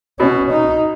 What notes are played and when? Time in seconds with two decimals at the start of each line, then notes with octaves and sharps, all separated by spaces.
0.20 B2 C#4
0.51 D#4